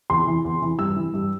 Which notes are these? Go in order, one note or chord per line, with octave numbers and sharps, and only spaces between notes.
E2 C6
E3
E2
E3
G2 E6
E3
G2